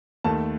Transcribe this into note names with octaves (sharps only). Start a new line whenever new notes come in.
D#2 D#3 A3 A5